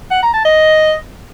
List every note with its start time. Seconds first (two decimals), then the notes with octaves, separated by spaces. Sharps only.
0.11 F#5
0.22 A#5
0.34 A5
0.45 D#5